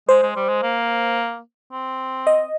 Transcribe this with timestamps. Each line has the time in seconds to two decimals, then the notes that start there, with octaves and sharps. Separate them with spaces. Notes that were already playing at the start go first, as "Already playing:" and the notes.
0.08 G#3 C5
0.23 G#3
0.36 G3
0.49 G#3
0.63 A#3
1.72 C4
2.27 D#5